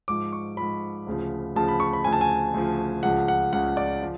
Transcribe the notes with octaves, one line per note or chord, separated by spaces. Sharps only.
G#2 F3 D6
C#6
G#2 F3 B5
D2 C#3 F3
D2 C#3 F3 A5
B5
C#6
B5
D2 C#3 F3 G#5
A5
G#5
D2 C#3 F3
C#2 C#3 F3 F#5
F#5
C#2 C#3 F3 F#5
D5
F3